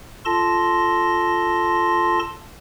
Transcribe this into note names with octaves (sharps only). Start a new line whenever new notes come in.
F4 A4 A5 C6 A#6